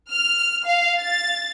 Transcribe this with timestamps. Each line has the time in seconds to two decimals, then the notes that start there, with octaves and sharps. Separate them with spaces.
0.11 F6
0.65 F5
0.99 A6